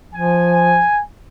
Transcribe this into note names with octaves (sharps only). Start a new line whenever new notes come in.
F3 G#5